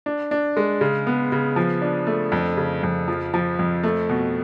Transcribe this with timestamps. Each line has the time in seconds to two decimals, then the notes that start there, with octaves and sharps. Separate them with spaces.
0.06 D4
0.31 D4
0.57 G#3
0.81 C#3
1.07 B3
1.32 C#3
1.56 F3
1.82 D4
2.07 A3
2.32 F2
2.57 C#3
2.83 F2
3.08 F3
3.34 F3
3.59 F2
3.83 A3
4.09 B2